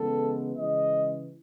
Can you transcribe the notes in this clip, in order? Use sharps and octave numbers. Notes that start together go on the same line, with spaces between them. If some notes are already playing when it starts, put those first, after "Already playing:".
Already playing: C#3 E3 G#3 B3 A4
C#3 E3 G#3 D#5